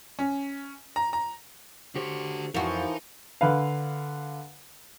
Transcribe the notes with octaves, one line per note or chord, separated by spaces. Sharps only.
C#4
A#5
A#5
D3 F#4 G4 C5 C#5
F2 E3 F3 D#4 F#4 A#4 C#5 F5
D3 B4 F5